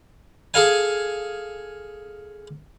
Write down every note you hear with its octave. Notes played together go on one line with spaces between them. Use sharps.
G#4 A4 F5 G#5